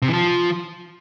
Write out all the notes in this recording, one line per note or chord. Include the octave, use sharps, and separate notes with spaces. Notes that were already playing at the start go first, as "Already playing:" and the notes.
C3
E3
F3